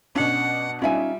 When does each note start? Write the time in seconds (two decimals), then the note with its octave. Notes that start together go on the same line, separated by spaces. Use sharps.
0.15 B2 C#4 D4 F#5
0.82 G3 C#4 D#4 F4 E5 G#5